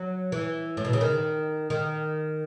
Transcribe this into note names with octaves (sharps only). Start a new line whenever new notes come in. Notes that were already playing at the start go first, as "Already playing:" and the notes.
Already playing: F#3
E3
A2
B2
C#3
D#3
D#3